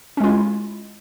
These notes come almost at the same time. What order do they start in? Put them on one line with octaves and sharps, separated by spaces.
C#4 G#3 F4 E4